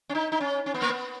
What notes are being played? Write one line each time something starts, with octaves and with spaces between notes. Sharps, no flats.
C#4
D#4
D#4
C#4
C#4
B3
A#3
B3